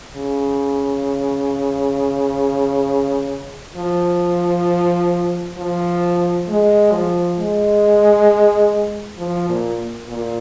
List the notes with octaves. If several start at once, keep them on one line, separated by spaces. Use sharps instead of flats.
C#3
F3
F3
G#3
F3
G#3
F3
A#2
A#2